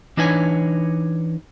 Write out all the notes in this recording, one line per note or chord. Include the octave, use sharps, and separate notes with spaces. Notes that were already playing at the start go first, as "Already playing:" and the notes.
E3 D4 D#4 B4 C#5 G#5